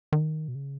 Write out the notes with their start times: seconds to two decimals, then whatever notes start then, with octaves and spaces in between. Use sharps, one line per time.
0.12 D#3
0.48 B2
0.55 C#3